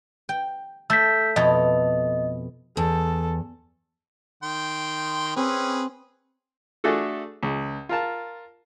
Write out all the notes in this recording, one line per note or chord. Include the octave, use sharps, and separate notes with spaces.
G5
A3 E6 G6 B6
F2 B2 A4 D#5
E2 A4
D#3 G5 C6
C4 C#4 G#4 B4
A3 D4 F#4 G#4 A4
C#2
F4 A#4 A5